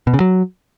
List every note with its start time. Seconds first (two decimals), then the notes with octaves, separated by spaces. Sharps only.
0.07 B2
0.14 C#3
0.20 F#3